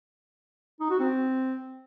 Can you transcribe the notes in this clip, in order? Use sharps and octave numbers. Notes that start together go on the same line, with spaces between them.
D#4
F#4
C4